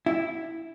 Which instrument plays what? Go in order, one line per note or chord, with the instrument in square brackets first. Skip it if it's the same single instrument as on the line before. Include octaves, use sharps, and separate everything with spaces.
[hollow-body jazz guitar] E4